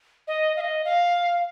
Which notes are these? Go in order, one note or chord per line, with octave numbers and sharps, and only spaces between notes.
D#5
F5
D#5
F5